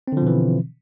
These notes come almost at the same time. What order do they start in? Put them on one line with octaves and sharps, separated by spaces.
C4 D3 F3 B2 E3